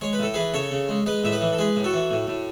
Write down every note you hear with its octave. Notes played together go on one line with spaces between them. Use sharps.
G#3 C#5
B4
A2 A4
E3 G#4 B4
C#3 A4 C#5
C#3
G#3
G#3 B4 D#5
A2 E5
B4 D#5
E3
A4
G#3 G#4 B4
A2
F#4 A4
E3
A2
A2